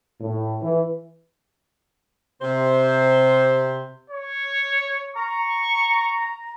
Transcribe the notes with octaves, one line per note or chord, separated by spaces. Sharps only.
A2
E3
C3 C5
C#5
A#5 C#6